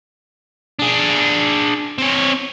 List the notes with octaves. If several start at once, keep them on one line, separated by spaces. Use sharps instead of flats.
D4 G#4
C4 C#5